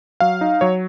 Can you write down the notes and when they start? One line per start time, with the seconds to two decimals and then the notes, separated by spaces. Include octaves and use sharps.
0.20 F#3 F5
0.41 D#4
0.61 F#3 C#5